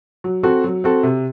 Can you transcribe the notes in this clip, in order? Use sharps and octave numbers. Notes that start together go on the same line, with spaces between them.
F#3
C4 F#4 A4
F#3
C4 F#4 A4
C3